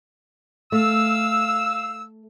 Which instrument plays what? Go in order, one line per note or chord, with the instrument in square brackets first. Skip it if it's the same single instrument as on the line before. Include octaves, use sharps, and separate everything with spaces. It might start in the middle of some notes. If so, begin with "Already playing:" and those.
[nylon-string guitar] A3 [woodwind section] F5 E6